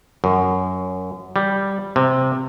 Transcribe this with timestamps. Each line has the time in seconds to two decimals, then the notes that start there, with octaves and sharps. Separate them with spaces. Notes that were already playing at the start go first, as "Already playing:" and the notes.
0.24 F#2
1.36 G3
1.96 C3